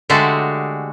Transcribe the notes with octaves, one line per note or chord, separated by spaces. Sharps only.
D3 G#3 A3 F#4 G4 D5